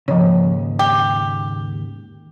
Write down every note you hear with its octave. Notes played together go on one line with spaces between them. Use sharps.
D#2 G#2 C#3 F3 C#5
G4